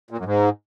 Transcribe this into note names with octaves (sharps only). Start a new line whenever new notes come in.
A#2
F#2
G#2